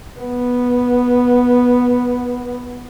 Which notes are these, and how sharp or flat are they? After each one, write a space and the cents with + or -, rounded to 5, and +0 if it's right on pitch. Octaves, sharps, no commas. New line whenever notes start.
B3 -5